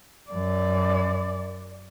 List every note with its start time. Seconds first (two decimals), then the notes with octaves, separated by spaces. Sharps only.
0.30 F#2 D5